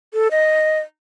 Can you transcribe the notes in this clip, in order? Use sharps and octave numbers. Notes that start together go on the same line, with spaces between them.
A4
D#5